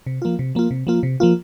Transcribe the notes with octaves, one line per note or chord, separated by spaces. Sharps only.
C3
F3 A#3 F4
C3
F3 A#3 F4
C3
F3 A#3 F4
C3
F3 A#3 F4